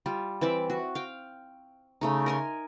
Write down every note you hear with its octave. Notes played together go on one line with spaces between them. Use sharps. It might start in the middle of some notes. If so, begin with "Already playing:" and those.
G3 F4
E3 C4 D5 E5
F#4
F5 G5
C#3 A3 D#4
A#4 G#5 C6